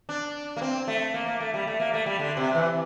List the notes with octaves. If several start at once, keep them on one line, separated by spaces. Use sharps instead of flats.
D4
A#3
C4
A3
A#3
A#3
A3
G3
A3
A#3
A3
G3
D3
C3
E3